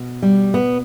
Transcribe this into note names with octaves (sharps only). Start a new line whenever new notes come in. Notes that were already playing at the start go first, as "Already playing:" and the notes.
Already playing: B2
G3
B3